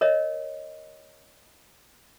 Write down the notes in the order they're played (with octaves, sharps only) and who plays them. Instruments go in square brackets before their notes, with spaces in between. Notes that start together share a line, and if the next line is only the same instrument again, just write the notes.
[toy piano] A#4 C#5 D#5